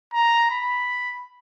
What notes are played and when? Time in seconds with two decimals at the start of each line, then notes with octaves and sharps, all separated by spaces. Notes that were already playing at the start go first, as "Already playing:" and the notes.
0.14 A#5
0.50 B5